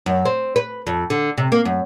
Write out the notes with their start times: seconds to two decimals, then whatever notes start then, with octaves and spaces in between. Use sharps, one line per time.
0.06 F#2
0.25 C4
0.56 B4
0.87 F2
1.10 D3
1.38 C3
1.52 A#3
1.65 F#2